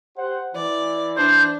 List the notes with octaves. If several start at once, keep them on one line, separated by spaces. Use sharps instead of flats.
G4 C5 F#5
E3 D5
D4 C5